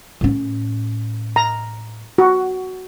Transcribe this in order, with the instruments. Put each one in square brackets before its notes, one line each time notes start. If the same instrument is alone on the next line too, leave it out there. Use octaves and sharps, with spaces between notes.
[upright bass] A2 C#4
[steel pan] A#5
F#4